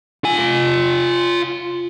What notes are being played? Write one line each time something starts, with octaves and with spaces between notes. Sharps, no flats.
F4 G#5